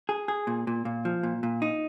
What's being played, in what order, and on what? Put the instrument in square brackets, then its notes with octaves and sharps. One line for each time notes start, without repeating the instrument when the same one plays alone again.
[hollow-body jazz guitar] G#4
G#4
A#2
A#2
A#2
F3
A#2
A#2
D#4